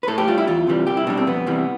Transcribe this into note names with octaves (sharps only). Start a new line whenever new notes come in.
B4
A2 A4
G4
G3 F4
E4
E2 F4
C3 E3 G3
C2 G4
E4
B2 G3 D4
C4
F2 B3
C3 E3 G3